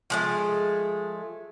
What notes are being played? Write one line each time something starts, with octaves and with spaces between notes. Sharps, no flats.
F3 G#3 A3